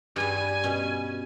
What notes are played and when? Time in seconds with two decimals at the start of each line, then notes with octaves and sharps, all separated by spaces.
0.16 G2 G3 G#5
0.64 B2 C#4